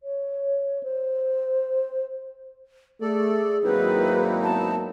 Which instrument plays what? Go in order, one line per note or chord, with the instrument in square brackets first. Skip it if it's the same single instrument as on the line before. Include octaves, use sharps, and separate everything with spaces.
[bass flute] C#5
C5
[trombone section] A3 [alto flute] G#4 [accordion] A4 D5
[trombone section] G#1 F#3 A#3 [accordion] C4 D#4 E4 [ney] B4
[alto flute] B3 [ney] A5